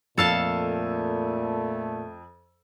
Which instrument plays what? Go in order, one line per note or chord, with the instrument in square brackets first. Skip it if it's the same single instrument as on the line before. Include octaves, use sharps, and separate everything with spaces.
[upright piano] F2 E6 [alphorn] A#2 [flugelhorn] A3 [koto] A4 F5 A5